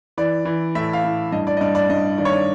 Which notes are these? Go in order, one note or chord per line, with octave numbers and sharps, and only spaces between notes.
E3 D5
E3
A2 E5
F5
A2
G2 D#5
D5
D#5
G2 D5
D5
G2 D#5
D#3 D5
C#5
D5